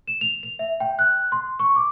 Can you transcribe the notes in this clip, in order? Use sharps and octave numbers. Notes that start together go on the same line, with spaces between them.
E7
F7
F7
E5
G5
F#6
C6
C#6
D6